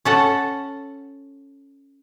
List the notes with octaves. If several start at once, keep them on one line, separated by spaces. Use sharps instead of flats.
C#4 A4 F#5